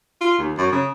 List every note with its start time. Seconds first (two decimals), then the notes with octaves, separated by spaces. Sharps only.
0.21 F4
0.38 D#2
0.57 F#2
0.72 C#3